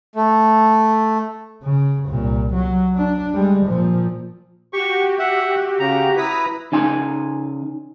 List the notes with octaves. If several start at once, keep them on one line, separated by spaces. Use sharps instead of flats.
A3
C#3
C2 A#2
F#3
D4
G3 G#3
A#2 F3
F#4 G4 C#6
E5 F#5
C#3 A#5
E4 B4 A#5 D#6 B6
C#3 D#4 G#5 C6